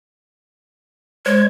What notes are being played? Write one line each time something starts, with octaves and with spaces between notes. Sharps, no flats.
G#3 C5 C#5 G#6